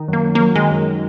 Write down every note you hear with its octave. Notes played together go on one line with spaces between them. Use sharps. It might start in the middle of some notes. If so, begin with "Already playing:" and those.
Already playing: D#3
F#2 A#3
F#2
F#3 A#3
D#3 G#3
F#2